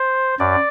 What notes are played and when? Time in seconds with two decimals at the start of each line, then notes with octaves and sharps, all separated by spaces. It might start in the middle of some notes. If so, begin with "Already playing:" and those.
Already playing: C5
0.39 F#2 D5